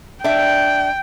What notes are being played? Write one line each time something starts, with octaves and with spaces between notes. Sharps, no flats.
D4 E5 G5